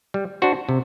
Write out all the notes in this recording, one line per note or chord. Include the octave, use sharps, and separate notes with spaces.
G3
D4 F#4 C5
C3